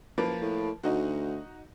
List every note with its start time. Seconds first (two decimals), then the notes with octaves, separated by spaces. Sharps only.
0.18 F#1 F3 A#3 B4
0.41 A2
0.83 D2 D#4 F#4